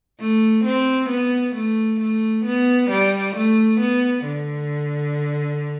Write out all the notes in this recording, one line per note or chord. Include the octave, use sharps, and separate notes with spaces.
A3
C4
B3
A3
A3
B3
G3
A3
B3
D3